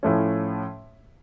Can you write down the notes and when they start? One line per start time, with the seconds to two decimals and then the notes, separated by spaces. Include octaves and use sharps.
0.03 A2 F3 A3 C#4